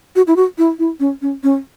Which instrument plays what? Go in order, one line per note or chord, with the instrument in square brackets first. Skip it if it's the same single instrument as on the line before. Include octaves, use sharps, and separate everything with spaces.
[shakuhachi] F#4
E4
F#4
E4
E4
C#4
C#4
C#4